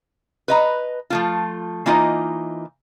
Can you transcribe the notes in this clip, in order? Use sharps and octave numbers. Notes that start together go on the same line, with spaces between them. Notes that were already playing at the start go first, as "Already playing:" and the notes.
B4 D#5 A#5
F3 A3 F4
E3 A#3 D#4 F4 C5 D#5